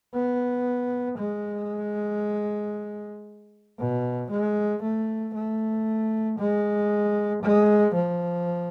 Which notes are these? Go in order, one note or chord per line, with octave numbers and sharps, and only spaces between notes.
B3
G#3
B2
G#3
A3
A3
G#3
G#3
F3